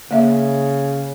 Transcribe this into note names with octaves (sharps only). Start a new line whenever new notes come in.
C#3 A#3 E5